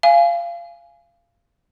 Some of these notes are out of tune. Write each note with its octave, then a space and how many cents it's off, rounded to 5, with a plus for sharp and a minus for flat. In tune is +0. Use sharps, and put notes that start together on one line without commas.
F5 -20 G#5 +0